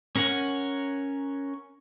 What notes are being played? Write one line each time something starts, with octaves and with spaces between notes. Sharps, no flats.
C#4 A#4 C#5 F#5 G#5